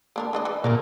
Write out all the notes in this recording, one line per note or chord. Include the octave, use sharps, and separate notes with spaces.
A#3 D4 A#4
E3 D4 D#5
E3
A#2 A3 D5 F5